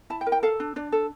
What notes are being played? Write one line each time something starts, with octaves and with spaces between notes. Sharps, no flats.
E4 A5
G5
A#4
G5
A4 F5
D4
D4 D5
A4